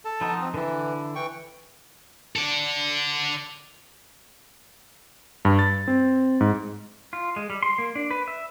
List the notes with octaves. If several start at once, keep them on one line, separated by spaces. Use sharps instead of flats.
A4 A5
F3 B3 D#4
C4
D3 E3 E4
E3 G5 C#6
A4 D5
G2
A6
C4
G#2
F4
G#3
G3
C6
A#3
D4
B4
E5